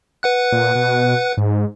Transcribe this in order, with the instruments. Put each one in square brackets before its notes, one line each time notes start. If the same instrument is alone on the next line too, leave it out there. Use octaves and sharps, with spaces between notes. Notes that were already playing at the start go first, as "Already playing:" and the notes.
[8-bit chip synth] B4 F#5 F#6
[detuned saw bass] A#2
B2
G#2